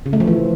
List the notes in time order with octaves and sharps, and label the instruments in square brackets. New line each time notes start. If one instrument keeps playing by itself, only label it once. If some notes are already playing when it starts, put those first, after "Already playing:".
[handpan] C#3
A3
F3
E3